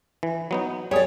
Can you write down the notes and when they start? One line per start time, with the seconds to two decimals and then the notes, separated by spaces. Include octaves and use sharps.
0.23 E3
0.51 F#3 B3 D#4
0.91 G3 G#4 C#5 D5